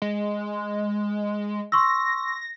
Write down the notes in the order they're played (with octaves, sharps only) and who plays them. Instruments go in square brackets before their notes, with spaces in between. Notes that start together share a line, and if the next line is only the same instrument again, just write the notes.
[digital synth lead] G#3
[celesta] C6 C#6 E6 [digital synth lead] A#6